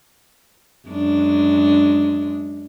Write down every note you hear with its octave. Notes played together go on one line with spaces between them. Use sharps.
F#2 G#3 D4